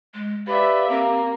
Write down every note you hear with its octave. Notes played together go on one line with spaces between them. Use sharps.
G#3
G4 B4 D5 E5 F5
A#3 C4